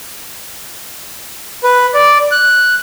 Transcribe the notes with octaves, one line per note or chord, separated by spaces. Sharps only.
B4
D5
F#6